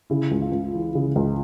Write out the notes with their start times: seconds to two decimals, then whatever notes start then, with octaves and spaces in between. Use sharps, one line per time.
0.10 C#3 E4
0.31 C#2
0.42 F4
0.52 C#2
0.73 E3
0.95 C#3
1.16 C#2